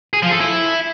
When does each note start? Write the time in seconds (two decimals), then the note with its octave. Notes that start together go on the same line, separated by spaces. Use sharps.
0.13 G#4
0.22 F3
0.31 A4
0.41 E4